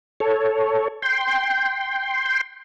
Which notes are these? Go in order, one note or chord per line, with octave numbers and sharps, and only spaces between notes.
A4 C#5
G5 C6